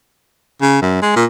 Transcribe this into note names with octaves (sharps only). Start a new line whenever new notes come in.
C#3
F#2
G#3
A#2